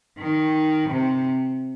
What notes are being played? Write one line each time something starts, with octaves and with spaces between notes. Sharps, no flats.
D#3
C3